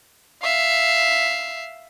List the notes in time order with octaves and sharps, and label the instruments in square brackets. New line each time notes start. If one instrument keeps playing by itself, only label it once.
[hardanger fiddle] E5 F5